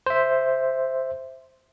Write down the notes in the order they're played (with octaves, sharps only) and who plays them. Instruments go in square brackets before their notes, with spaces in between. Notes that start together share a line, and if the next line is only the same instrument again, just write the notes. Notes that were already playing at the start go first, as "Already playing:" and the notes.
[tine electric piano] C5 E5